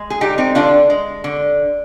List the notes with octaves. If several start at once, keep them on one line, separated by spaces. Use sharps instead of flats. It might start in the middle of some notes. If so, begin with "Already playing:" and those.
Already playing: G#3
G#4
D3 D#4 G4
C4 D#4
D3 D4 F4
G#3
D3